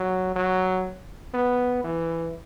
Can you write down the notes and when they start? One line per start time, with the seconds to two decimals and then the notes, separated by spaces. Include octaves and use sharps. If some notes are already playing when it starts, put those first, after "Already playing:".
Already playing: F#3
0.36 F#3
1.34 B3
1.84 E3